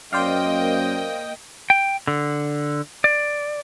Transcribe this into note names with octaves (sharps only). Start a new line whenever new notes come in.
F#2 A#3 C5 D5 D#5 F5 G5
G5
D3
D5